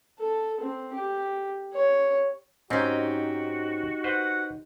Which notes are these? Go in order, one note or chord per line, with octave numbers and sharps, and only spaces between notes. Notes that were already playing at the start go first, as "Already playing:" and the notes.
A4
C4
G4
C#5
G#2 C4 C#4 D#4 F#4 G4
B4 C5 F#5